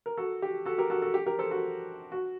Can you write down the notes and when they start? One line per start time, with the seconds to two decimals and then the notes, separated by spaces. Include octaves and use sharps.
0.06 A#4
0.18 F#4 A4
0.42 G4
0.66 F#4 A4
0.78 G4 A#4
0.90 F#4 A4
1.02 F#4 A4
1.14 G4
1.26 G4 A#4
1.39 A4 C5
1.51 F#4 A4
2.12 F#4